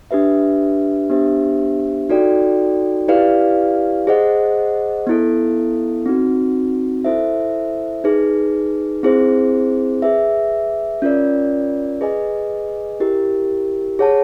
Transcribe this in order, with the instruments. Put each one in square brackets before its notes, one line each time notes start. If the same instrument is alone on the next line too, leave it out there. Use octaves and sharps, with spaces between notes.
[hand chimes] D4 G4 B4 E5
B3 D4 G4 C5 E5
D#4 F#4 A4 D5 G5
E4 G4 B4 D5 F5
G#4 C5 D#5 F#5
B3 E4 A4
C4 D#4 F#4
E4 A4 C5 E5
D#4 G#4 B4
C4 E4 G#4 C5
G#4 B4 E5
C#4 F4 A#4 D5
G#4 B4 D#5 G#5
E4 G4 A#4
G#4 C#5 F#5 A5